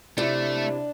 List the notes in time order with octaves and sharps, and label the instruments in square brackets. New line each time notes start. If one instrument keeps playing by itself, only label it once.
[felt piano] C3 E4 [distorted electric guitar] A3 [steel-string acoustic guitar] D4